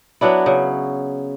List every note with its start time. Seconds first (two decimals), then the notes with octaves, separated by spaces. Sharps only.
0.21 F#3 B3 D4 E4
0.46 C#3